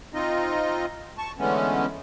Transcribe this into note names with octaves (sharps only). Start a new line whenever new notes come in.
C4 D#4 F4 D#5
A5 C#6
D3 E3 G#3 A3 B3 C#4